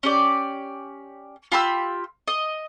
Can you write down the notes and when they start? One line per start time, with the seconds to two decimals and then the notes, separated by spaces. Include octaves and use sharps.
0.03 C#4 G4 D5
1.52 F4 G4 B5 E6
2.28 D#5